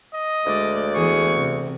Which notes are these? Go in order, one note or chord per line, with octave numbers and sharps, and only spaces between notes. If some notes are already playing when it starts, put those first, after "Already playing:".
D#5
D2 G#3 D5
E2 E3 G#4 C#6
C3